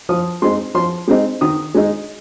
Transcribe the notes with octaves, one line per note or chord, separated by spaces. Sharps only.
F3 D#6
G#3 C4 D#4 C6
F3 C6
G#3 C4 D#4
D#3 D#6
G#3 D#4